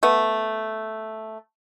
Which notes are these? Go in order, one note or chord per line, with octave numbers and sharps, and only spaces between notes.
A3 B3